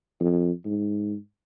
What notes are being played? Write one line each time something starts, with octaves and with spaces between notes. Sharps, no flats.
F2
G#2